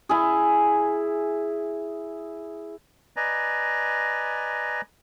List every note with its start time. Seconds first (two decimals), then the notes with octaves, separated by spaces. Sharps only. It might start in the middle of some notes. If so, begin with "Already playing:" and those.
0.09 E4 G#4
3.16 B4 D5 D#5 G#5 A#5